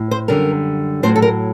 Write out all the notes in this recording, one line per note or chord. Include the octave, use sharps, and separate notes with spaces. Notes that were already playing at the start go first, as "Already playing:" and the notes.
Already playing: A2
C5
F#2 D3 G3 A#4
A2 F#3 C5
A4
A#4